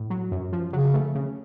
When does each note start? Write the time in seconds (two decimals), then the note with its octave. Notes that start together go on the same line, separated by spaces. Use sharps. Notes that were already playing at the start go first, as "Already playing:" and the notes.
Already playing: A2
0.10 F#3
0.31 F#2
0.53 F3
0.73 C#3 F#3
0.94 A3
1.15 C#3